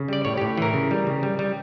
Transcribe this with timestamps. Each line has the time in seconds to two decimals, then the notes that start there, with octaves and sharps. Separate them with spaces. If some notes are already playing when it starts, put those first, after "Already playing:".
Already playing: C#3
0.08 G3 D5
0.25 A2 C#5
0.37 G4
0.41 A2
0.58 E3 A#4
0.74 C#3
0.91 G3
1.07 C#3
1.23 G3
1.39 G3